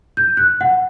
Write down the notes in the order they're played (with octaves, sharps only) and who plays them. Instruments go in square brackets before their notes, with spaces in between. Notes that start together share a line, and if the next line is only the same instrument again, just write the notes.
[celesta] G6
F#6
F#5